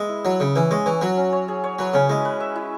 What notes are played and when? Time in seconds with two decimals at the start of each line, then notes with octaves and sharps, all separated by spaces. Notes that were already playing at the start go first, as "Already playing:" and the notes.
Already playing: G#3 B3 B4 E5
0.09 E4
0.25 F#3 E4
0.40 C#3 E4
0.55 E3 C#4
0.71 G#3 C#5
0.86 E3 C#5
1.01 F#3 F#4
1.17 C#4
1.33 C#5
1.48 G#4
1.64 C#5
1.79 F#3 B4
1.94 C#3 C#4
2.09 G#3 E4
2.25 B4
2.40 E5
2.56 E4